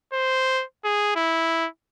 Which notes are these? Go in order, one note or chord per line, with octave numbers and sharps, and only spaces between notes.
C5
G#4
E4